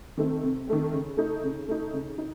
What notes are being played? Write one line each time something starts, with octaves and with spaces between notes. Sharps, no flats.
D#3 A3 C4
C3
D#3 A3 C4
C#3
A3 D#4
C#3
A3 D#4
C#3
D#4